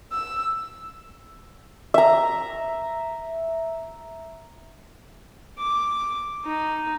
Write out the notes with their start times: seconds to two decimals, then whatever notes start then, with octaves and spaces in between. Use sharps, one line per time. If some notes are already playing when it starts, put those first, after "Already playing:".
0.12 E6
1.94 E5 A#5
5.59 D6
6.45 D#4